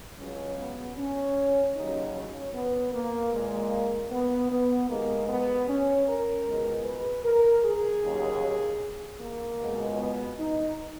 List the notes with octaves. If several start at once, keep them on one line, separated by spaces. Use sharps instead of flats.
C#2 C#3 F#3 C#4
B3
C#4
D#2 C#3 F#3 D#4
C#4
B3
A#3
A#2 G#3 A#3
B3
B3
D#2 D#3 G#3 A#3
B3
C#4
A#4
C#2 B2 G#3
B4
A#4
G#4
D#2 C#3 F#3
A#3
C#2 B2 G#3
B3
D#4